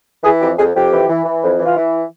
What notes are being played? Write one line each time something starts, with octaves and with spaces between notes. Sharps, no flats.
E3 G#4
F2 G4
F2 G#4
F2 G4
E3
E3
E3
F2
E3
F4
E3 E4